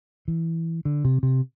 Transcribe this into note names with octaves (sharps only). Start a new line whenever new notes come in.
E3
D3
C3
C3